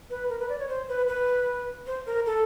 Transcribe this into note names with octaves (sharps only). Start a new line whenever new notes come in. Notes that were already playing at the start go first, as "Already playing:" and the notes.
B4
A#4
B4
D5
C#5
C5
B4
B4
C5
A#4
A4